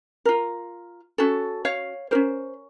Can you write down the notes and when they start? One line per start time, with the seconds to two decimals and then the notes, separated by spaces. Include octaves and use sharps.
0.25 F4 A#4
1.18 C#4 F#4 A4
1.65 C#5 F5
2.11 C#4 F#4 A#4 C5